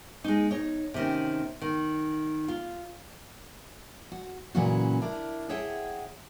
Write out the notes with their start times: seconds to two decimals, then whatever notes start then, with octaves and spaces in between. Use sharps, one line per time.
0.24 G#3 D#4
0.51 D#4 C#5
0.94 C3 D#3 C#4
1.62 D#3
2.48 F4
4.12 F#4
4.55 A#2 C#3 E3 F#3 C#4 F#4
5.02 D4 E4 A#4 F5
5.49 G#4 C#5 E5 F#5 G5